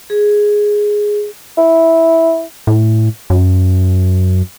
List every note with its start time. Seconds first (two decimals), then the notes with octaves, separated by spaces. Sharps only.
0.10 G#4
1.57 E4
2.67 A2
3.30 F#2